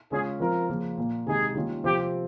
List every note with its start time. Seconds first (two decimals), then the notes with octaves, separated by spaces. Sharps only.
0.11 C#3 G#3 C#4 F4 G#4
0.40 F3 C4 F4 A#4
0.69 C#3 F3 A#3
0.98 A#2 F3 A#3
1.26 C3 D#3 G#3 D#4 G#4
1.55 D#3 G3 A#3 C#4 F4
1.84 C3 F3 C4 F4 G4